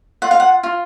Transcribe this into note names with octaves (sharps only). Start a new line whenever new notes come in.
F4 F#5
F5
F#5
F4